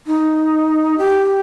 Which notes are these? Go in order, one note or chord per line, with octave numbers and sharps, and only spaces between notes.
D#4
G4